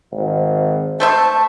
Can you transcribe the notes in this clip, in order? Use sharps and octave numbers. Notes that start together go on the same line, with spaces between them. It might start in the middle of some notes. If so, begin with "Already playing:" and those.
G#1
A3 C5 E5 A5